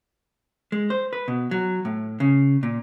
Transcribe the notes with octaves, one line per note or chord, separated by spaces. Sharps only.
G#3
C5
B4
B2
F#3
A2
C#3
A#2